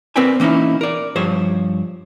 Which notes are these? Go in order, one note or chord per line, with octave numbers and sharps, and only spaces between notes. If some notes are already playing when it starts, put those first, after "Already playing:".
C4 A#4 B4 D5 G5 G#5
E3 A#3 C#4 D#4 E4
A#4 D5
G2 F3 C5 C#5